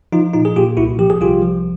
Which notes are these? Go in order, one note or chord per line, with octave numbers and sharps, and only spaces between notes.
F3 D#4 F4
A#2 D#4 F4
G#4
A#2 F4 G4
C2 E4 F#4
F3 G4
G#4
C2 F4 G4
F3